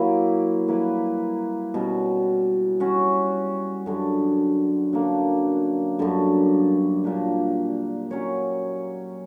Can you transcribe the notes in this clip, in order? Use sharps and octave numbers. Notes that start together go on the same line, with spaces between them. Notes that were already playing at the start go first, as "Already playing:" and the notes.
Already playing: F#3 A#3 E4 G4
G3 A#3 E4 B4
B2 G3 C#4
G3 C#4 F#4
F#2 D3 G3
F#2 D3 A#3 D4
F#2 D3 G3
A#2 A#3 D4 G4
F#3 C#4 G4 C#5